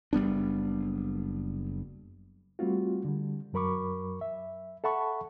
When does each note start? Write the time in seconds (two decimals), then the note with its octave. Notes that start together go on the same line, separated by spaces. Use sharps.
0.13 F#1 G3 B3 D4
2.59 G3 A3 C4 F4 F#4
3.05 D3 G3
3.53 F#2 F#3 A#4 B5 C#6 D6
4.21 E5
4.84 A4 E5 F#5 A5 B5 C#6